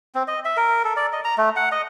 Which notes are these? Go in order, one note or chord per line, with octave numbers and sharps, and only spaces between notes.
C4
D#5
E5
A#4
A4
D5
D#5
A#5
A3
F#5
D#5